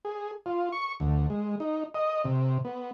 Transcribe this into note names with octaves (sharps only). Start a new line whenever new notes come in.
G#4
F4
C#6
D2
G#3
D#4
D#5
C3
B3